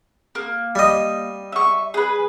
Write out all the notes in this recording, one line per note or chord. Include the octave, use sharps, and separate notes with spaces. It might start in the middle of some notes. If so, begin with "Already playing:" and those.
A#3
G3 D#5
E5 C#6
G#4 B4